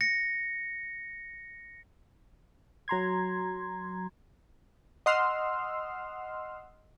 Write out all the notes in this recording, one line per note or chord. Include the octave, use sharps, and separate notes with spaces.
A#6 C#7
F#3 A#5 C6 G#6
D#5 F#5 C6 E6 F6